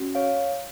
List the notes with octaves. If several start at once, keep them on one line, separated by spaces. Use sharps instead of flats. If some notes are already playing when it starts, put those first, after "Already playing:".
Already playing: C#4 F#4
C#5 F5